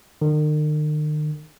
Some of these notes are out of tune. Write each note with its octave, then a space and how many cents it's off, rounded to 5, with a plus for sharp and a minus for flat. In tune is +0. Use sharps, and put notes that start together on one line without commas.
D#3 -45